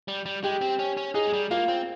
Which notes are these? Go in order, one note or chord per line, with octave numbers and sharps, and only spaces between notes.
G3
G3
G#3 G4
C4
C#4
C#4
D#4 G#4
G#3
G3
A#3 F4
C4